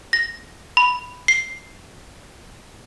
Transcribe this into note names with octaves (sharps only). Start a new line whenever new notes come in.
A#6
B5
C7